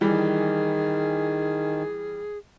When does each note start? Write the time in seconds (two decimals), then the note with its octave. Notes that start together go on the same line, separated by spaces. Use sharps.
0.01 D#3 E3 G3 G#4